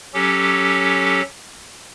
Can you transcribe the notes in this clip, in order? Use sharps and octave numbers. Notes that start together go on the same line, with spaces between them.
F#3 C#4 G4 A4